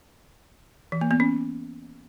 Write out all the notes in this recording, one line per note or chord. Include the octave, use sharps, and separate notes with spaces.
E3
A#3
B3
C#4